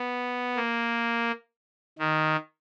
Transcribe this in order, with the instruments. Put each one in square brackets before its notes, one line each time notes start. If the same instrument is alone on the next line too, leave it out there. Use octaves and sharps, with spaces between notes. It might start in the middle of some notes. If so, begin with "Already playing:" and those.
Already playing: [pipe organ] B3
A#3
D#3